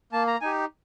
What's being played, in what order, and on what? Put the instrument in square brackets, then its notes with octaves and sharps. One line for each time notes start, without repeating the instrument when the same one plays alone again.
[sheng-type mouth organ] A#3 A5
A#5
D#4 G4 G#5